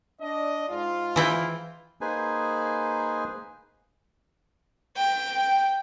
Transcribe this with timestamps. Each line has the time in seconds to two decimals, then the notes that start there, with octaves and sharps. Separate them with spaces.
0.21 D4 D5 D#5
0.69 G#2 F4
1.16 E3 E4 G5
2.01 A#3 D#4 G#4 B4 C5 G#5
4.97 G5